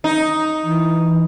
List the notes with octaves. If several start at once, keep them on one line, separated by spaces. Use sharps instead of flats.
D#4
E3